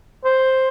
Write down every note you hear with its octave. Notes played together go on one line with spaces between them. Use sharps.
C5